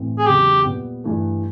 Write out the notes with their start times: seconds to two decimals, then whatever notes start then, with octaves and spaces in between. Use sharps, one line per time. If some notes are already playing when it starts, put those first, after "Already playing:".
Already playing: A2 E3 A3 C4
0.18 G#4
0.26 E2 C#3 F#3 G4
0.64 A#2 G3 B3
1.04 G2 E3 A3